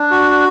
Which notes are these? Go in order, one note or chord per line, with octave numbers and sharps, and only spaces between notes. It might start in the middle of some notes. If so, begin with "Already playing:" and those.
Already playing: D4
F#4